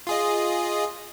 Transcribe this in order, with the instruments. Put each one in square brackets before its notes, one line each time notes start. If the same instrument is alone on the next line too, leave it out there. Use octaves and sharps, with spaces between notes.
[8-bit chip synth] F4 G#4 D#5